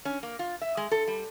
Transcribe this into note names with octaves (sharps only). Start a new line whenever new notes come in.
C#4
A#3
F4
E5
G#3
A4
G3